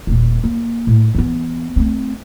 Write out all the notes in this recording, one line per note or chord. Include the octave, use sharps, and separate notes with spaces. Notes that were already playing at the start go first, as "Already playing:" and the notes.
D#1 A#2
A#3
A2
E3 B3
A3 C4